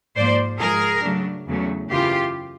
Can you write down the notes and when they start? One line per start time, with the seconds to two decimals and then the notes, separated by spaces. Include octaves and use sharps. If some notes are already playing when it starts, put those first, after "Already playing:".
0.16 G#2 F3 A#3 C5 D5
0.60 G#2 F3 G#3 G#4 A#4
1.03 C#3 F#3 A3 D4
1.47 E2 C#3 F#3 A3 C#4
1.90 F#2 C#3 E3 F4 G4